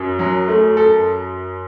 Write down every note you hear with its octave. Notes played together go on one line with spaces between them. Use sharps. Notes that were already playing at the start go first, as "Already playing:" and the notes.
Already playing: F#2
F#3
A3
A4